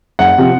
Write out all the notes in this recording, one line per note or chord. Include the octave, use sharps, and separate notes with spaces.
F#1 F#5
C3 F3